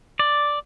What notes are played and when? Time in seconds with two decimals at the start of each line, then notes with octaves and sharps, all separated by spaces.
0.19 D5